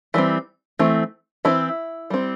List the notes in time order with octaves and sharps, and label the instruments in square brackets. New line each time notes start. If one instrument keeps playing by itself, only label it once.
[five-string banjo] E3 G3 C4
E3 A3 C4
E3 C4 E4
G3 C4